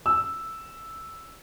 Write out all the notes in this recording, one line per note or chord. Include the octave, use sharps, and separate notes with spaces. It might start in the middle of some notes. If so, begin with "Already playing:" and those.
E6